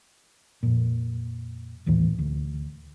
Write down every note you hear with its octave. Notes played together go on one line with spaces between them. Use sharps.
F2 A#2
A#1 D#2 A2 E3
D2